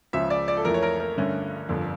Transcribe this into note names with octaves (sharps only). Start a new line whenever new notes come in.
C#2 C#3 F3 E5
D5
D5
A4
F2 E3 A3 A#4
C#5
A#4
A#4
G2 D3 A3 C#4
G1 F2 D3